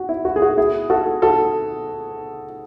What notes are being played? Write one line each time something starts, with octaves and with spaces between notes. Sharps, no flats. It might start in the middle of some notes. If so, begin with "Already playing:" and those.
Already playing: F#4
E4
F#4
G#4
F#4
E4 G#4
F#4 A4
F#4 A4